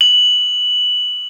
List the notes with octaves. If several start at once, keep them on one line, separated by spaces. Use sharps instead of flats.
F#7